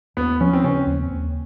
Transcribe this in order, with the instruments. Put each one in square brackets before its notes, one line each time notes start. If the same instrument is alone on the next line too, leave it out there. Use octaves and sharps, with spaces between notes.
[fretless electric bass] D#2 [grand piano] B3
[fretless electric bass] F3 [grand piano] C#4
[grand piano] C4
[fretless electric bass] C#3 [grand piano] C#4
[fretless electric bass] D#2
D#2